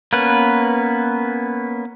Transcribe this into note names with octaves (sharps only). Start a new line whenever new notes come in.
A#3 B3 C#4 B4